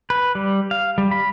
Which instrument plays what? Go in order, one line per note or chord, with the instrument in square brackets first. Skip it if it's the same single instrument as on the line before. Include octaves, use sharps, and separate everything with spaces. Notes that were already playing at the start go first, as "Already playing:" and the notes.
[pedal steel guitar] B4
G3
F5
G3
B5